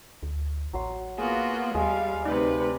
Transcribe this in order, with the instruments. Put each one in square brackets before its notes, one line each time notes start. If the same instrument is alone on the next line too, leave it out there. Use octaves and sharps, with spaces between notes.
[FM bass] D2
[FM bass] A1 [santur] F#3 C6
[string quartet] A#3 F4 F#4 [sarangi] B3 [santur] G#4
[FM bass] D#2 [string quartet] G3 [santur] G#3 G5 [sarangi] F5
[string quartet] D2 C3 B4 [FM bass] D#4 [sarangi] D5